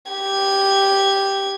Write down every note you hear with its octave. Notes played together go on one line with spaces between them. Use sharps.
G4 G#6